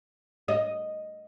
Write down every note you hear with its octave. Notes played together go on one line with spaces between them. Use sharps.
D#5